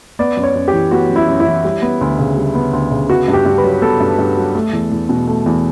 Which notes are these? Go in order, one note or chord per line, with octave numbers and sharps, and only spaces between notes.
B3 D5
F#2
C#5
F#2
G4
E3
B3 F#4
F#2
E4
F#2
E4
E3
G3
B3
D2
C#3
G3
B3
D2
C#3
B3 F#4
G2
G4
G2
B4
F#3
B3 A4
G2
G2
F#3
A3
E2
E2
B2
A3
E2